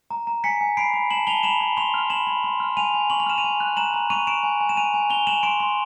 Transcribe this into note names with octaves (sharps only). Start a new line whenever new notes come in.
A#5
A#5
G#5 B6 C#7
G#5
B5 C7 D7
B5
A5 E7 F#7
A5 F7 G7
B5 E7 F#7
B5
C6 F7 G7
F6
B5 E7 F#7
B5
C6
F6
G#5 D#7 F7
G#5
C#6 F#7
F7
F6 E7
D#7 F7
G#5
F#6
A#5 E7 F#7
A#5
C#6 D#7 F7
C#6 D7 E7
G#5
G#5
E7
G#5 D#7 F7
G#5
G#5 F7 G7
G#5 E7 F#7
C6 D7 E7
C6